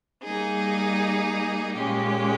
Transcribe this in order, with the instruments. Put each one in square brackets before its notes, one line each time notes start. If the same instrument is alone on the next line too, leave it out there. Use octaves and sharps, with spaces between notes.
[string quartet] G3 A#3 D#4 G#4
A#2 G#3 C#4 G4